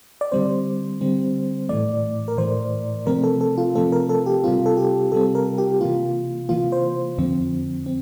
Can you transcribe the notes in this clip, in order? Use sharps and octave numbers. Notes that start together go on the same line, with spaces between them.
D5
D3 G3 C4 C5
D3 G3 C4
A2 E3 A3 D5
A#4
A2 E3 A3 C5
C3 F3 A3 C4 A#4
A4
A4
F4
C3 F3 A3 C4 A4
A#4
A4
G4
C3 G3 C4 F4
A4
G4
C3 G3 C4 A4
A#4
G4
C3 E3 A#3 F4
C3 E3 A#3 F4
C5
F2 D3 F3 C4
C4